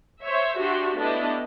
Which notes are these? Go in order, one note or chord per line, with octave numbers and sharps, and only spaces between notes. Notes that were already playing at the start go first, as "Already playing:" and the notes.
C5 C#5 E5
D4 F#4 G4 E5 C6
A3 B3 D4 E4 G4 D#5